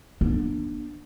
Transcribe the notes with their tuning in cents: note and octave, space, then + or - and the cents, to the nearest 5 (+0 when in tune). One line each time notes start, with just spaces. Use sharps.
B3 -35 D4 +20